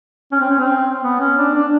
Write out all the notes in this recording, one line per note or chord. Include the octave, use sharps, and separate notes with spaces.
C#4
C4
C#4
C4
B3
C#4
D4
D4